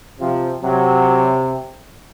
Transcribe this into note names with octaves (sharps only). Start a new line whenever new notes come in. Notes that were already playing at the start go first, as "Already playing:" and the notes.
C3 F3
C3 F#3